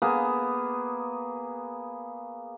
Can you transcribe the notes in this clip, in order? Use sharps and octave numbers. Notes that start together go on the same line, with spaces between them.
A#3 B3 G#4